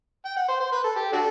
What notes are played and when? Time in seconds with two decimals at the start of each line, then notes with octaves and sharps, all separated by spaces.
0.25 G5
0.36 F#5
0.48 C5
0.60 C5
0.72 B4
0.84 A4
0.96 G4
1.13 D4 F#4 A4